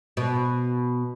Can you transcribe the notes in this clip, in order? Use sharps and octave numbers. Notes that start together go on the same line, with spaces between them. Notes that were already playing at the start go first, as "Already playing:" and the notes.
B2